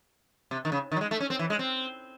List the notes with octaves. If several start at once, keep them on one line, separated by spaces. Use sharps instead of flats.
C3
D#3
C#3
D#3
F#3
G#3
A3
C#4
C4
E3
G#3
C4